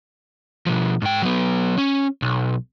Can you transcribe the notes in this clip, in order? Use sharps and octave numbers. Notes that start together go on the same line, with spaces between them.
B2 F3
G#2 G5
F#3 B3
C#4
B1